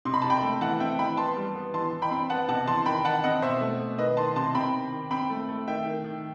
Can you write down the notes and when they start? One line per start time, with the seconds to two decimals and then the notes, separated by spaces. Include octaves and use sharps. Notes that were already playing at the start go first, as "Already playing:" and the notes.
0.05 C3 C6
0.14 B5
0.22 C3 A5
0.30 G5 B5
0.42 A3
0.61 E3 F#5 A5
0.80 C4 E5 G5
0.99 E3 G5 B5
1.17 B3 A5 C6
1.37 G3
1.55 B3
1.74 E3 A5 C6
1.93 E3
2.02 G5 B5
2.11 C4
2.30 B3 F#5 A5
2.48 C3 F#5 A5
2.67 E3 A5 C6
2.86 D#3 G5 B5
3.05 D#3 F#5 A5
3.24 C4 D#5 F#5
3.42 B2 C5 E5
3.61 A3
3.80 B2
3.98 D#3 B4 D#5
4.17 D#3 A5 C6
4.36 C3 A5 C6
4.55 C4 G5 B5
4.73 D#3
4.92 D#3
5.11 C4 G5 B5
5.30 A3
5.49 A3
5.67 D#3 E5 G5
5.86 D#3
6.04 D#3